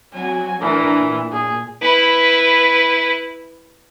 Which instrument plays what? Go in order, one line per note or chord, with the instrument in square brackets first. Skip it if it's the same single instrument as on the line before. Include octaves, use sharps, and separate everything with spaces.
[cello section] F#3 C4 F#4 [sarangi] G#5
[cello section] A2 D4 A#4 [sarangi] E3
[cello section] A#2
[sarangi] G#4
[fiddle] E4 B4